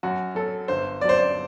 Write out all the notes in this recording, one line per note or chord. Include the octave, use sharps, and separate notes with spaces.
F#2 F#4
F#3 A4
G1 C5
F#2 F#3 C5 D5
D5